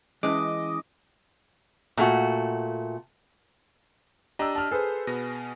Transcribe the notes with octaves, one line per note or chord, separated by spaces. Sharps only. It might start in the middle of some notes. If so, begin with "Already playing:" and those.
E3 G#3 C#4 D#5 A5 D6 D#6
A#2 A3 F#4
D4 G4 D#5 A#5 E6
A5 F6
G#4 A4 B4 C5
B2 B3 A#6